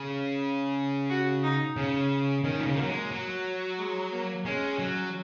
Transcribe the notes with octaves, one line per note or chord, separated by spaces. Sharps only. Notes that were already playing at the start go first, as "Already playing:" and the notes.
Already playing: C#3
F#4
D#4
C#3 C#4
D#3 C#4
A#2
C#3
D#3
F#3 A#3
G#3
F#3
G#3
A#3
G#3 C#4
F#3